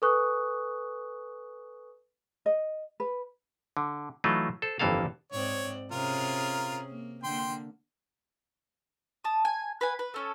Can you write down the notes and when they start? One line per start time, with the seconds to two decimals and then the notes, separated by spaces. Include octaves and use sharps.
0.02 A4 B4 G#5 C#6 D#6 F#6
2.46 D#5
3.00 B4
3.77 D3
4.24 E3 F#3 A3 D#4 F4
4.62 A4 C5
4.79 G1 F2 E3 A#3 A4 F5
5.32 G#2 C4 C#5 D5
5.92 C3 C#4 F4 G#4 A#4
6.89 A#3
7.24 D3 A#3 G5 C6
9.24 A5 D#6
9.45 G#5
9.81 B4 F#5 G#5
9.99 B4
10.14 A3 C#4 A4